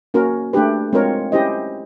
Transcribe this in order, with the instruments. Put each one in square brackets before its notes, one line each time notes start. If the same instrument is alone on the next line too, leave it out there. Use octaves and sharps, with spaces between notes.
[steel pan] A#3 C#4 F#4 A#4
A3 D4 G4 B4
G#3 C4 F4 A#4 C#5
C#4 E4 G4 C5 D#5